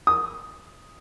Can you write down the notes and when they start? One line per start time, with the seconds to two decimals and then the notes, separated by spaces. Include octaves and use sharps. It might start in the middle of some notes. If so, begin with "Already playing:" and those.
0.07 D#6